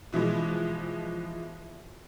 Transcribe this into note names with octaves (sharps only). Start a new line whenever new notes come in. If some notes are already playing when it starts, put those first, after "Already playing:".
B2 E3 F3 G#3